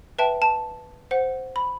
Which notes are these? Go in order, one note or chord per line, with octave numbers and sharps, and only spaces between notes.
B4 E5 G5 A5
A5
C5 F#5
B5